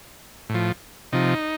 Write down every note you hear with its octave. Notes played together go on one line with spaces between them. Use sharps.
A2
F3
C3 F3 D#4